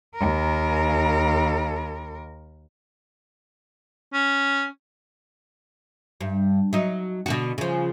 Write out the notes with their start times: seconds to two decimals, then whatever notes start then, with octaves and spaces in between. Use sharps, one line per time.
0.16 D#2 A#4
4.13 C#4
6.21 G2
6.73 F#3 D#4
7.26 B2 D3 F#4
7.58 C#3 F3